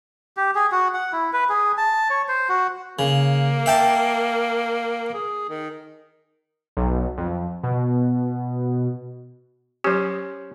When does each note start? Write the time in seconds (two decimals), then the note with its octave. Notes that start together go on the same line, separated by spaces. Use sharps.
0.37 G4
0.55 G#4
0.72 F#4
0.94 F#5
1.13 E4
1.33 B4
1.49 G#4
1.78 A5
2.10 C#5
2.28 C5
2.49 F#4
2.99 C#3 A#3
3.66 E5 G5 A5
5.14 G#4
5.49 D#3
6.77 B1
7.17 F2
7.63 B2
9.84 F#3 C#4 G4 C5